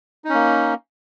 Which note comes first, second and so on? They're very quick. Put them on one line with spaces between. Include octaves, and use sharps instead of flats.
D#4 C#4 A#3